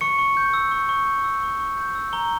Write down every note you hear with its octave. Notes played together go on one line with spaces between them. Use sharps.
C#6 C#7
C#6
G6
E6
C#6
C#6
G6
E6
C#6
C#6
G6
E6
A#5 G7